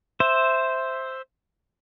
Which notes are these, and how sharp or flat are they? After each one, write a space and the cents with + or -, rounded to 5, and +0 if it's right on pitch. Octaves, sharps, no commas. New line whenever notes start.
C5 +0 E5 +0